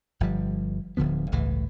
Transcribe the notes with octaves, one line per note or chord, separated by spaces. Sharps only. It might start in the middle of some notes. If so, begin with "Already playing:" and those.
G1 F3 G3
D1 D3 F3 B3
G1 C#2 A2 E3